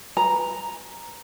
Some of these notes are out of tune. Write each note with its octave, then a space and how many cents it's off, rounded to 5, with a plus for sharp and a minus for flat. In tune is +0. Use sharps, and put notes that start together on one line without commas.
B4 +0 A#5 +0